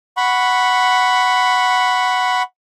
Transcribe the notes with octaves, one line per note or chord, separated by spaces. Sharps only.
F#5 B5 C#6